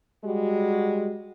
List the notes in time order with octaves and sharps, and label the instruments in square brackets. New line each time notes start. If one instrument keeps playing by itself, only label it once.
[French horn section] G3 G#3 F#4